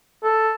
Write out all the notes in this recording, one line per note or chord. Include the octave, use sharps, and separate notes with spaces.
A4